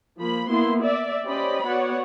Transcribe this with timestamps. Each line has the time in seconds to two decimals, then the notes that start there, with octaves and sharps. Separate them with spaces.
0.19 F3 A#3 B5
0.49 A#3 B3 E4 C6
0.83 D5 E5
1.24 C#4 G4 C5 D5 D#5 B5
1.67 B3 F#4 C#5 D5 F#5